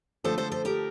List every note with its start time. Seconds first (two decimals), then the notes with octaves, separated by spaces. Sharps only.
0.24 D3 F3 A3 A4 C5
0.38 A4 C5
0.52 A4 C5
0.65 G4 A#4